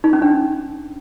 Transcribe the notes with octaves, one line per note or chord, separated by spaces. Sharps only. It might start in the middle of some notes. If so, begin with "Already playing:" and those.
D#4
C#4
D4